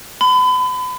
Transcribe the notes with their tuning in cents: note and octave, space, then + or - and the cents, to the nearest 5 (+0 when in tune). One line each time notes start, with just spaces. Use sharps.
B5 +35